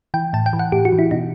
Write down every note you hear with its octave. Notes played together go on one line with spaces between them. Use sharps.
E3 G5
A2 A5
G5
E3
F#5
A2 G4
F#4
E3
E4
B2 D#4